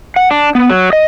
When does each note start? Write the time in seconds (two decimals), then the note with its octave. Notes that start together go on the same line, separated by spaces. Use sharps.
0.16 F#5
0.31 D4
0.55 B3
0.70 F#3
0.93 D#5